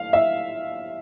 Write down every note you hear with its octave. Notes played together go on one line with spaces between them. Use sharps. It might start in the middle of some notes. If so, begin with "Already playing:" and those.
Already playing: F5
E5